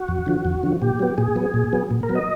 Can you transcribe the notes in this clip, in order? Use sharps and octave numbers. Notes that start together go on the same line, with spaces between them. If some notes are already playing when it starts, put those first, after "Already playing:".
Already playing: F#4
F2
D3 F3
F2
D3 F3
A#2 G4
F#3 B3
A#2 G#4
F#3 B3
A#2
F#3 B3
A#2
A#4
F#3 B3
D#5